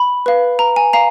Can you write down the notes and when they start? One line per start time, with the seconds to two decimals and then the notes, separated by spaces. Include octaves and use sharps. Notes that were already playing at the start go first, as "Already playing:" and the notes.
Already playing: B5
0.26 B4 F5
0.59 A#5
0.76 G#5
0.93 F5 A#5